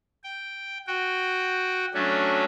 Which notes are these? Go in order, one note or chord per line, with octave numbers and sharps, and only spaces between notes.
G5
F#4 G5
F#3 A3 C#4 D4